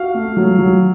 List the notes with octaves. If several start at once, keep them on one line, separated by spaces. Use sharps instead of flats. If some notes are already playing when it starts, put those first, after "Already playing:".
Already playing: F#4 F5
A3
F#3
F#3